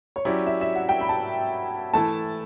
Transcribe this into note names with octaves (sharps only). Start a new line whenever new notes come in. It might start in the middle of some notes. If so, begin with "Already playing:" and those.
C#5
F#3 C#4 E4 G4 D5
E5
E5
F#5
G5
B5
A5
E3 A3 E4 A5